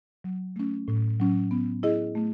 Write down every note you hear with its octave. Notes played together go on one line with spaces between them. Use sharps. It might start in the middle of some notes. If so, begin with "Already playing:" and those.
F#3
A3 C#4
A2
F#3 C#4
B3
E4 G#4 D#5
A3